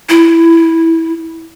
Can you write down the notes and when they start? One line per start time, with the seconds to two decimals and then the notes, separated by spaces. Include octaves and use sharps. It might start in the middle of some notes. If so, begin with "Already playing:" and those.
0.09 E4